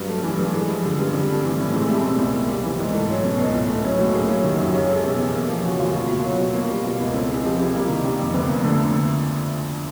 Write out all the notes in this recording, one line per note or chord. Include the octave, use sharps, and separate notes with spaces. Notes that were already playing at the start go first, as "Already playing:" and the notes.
Already playing: G2 F#3
A3
E3 G3
G2
G#3
F3
D3 G3
G2 G3
G3 C4
A3
E3
A2
G#3 C4
G3 A3
B2 G#3
C2
A#3
G3
E3 C4
G#2
A3
F#3
B2 C#4
C#2
A2
A3
F#3 C#4
A2 F#4
A#3 G#4
F#3
D#3 G4
F#4
F#2
F4
C#4 G4
G#3 A4
B2 G4
E2
A#3
F3
C#3 F#4
D2 F4
B2 F#4
A#3 F4
F#3 F#4
B2
A#3
G3
B2 F4
C#2 E4
C4 A4
G#3 G#4
F3 G4
C3 E4
G3 A#3
D#3
C3
F2
D2 B3
F3 A#3
D3 A3